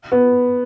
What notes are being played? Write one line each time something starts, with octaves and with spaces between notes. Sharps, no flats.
B3